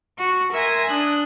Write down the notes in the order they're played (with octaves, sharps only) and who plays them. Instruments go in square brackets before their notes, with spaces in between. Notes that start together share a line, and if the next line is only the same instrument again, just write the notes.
[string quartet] F#4
A#4 E5 G#5 C6 A#6
D4 D#6 F#6